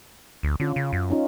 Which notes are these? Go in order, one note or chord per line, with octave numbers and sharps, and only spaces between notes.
D2
D3 C#4 F4
C#3
F#2
C#4 D#4 F4